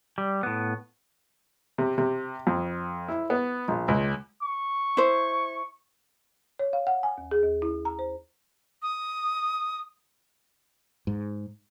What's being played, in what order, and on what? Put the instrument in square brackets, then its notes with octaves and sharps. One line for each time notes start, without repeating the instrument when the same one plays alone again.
[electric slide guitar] G3
A2 B3
[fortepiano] C3
C3
F2
E4
B3
A#1
C#2
[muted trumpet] C#6
[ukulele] E4 C5
[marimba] C#5
F5
F#5
G#5
D#2
G#4
D#2
E4
A#5
C5
[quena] D#6
[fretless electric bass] G#2